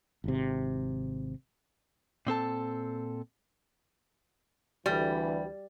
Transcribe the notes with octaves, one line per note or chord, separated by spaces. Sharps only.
G#1 C3
A#2 C4 A4 A5
D2 E3 G3